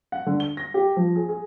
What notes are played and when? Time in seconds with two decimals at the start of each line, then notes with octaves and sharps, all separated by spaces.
0.12 F#5
0.26 D3
0.40 G7
0.57 A#6
0.74 G4
0.97 F3
1.16 G#4
1.29 G#4